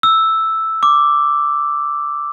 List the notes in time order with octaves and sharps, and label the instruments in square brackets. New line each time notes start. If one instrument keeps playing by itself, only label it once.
[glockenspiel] E6
D6